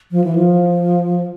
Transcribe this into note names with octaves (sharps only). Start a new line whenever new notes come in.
F3
E3
F3